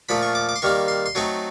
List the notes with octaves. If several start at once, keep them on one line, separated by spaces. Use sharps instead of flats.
A#2 F3 A3 B5
C#6
D6
D6
C6
D#3 G3 A#3 D#4 C#6
C6
C6
F#3 A3 C4 D#4 C#6